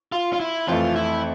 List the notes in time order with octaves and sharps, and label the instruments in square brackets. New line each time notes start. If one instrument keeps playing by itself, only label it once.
[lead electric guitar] F4
F4
E4
[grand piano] F2 E3 A3 [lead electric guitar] F4
[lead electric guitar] E4